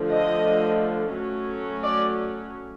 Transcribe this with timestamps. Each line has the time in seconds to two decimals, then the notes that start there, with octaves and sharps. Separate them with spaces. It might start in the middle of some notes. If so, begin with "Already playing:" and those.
Already playing: D3 F3 A3
0.09 D#5
1.14 F#3 A3 C#4
1.83 D5